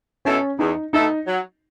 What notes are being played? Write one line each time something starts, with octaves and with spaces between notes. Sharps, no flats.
B2 A3 C#4 E4 A4
E2 D#4
B2 A3 D#4 E4 A4
F#3